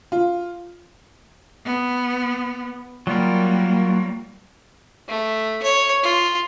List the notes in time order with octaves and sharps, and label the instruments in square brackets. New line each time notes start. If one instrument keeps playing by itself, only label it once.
[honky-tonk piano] F4
[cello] B3
[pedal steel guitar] F#3 F4 A#4 [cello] G3 A#3
[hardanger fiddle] A3
C#5
F4